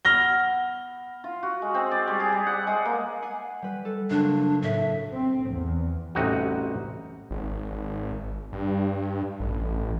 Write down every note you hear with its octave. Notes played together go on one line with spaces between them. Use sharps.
B3 F6 A#6 G7
F4
F#4
G#3
C4
D5
G3
G#4
G3
F#5
G#3
A#3
F#5 G#5 C7
G3 B4
A4
F#1 D4
A2 E5
C4
E2
A1 C3 G3 D#4 F#4
G#1
G2
A1